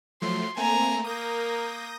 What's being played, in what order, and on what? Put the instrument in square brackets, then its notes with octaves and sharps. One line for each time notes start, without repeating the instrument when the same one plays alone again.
[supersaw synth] F3 F#3 A3 [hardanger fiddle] C6
[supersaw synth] A3 A#3 C4 [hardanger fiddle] G#5 A#5
[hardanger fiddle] A#3 A#4 [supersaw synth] D#6 G6 A#6